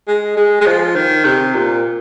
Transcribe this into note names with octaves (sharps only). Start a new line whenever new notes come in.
G#3
G#3
G#3
F3
D#3
C3
A#2